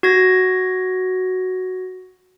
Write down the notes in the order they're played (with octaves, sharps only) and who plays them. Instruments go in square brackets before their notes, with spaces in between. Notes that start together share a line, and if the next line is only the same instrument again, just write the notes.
[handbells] F#4 G#6 A#6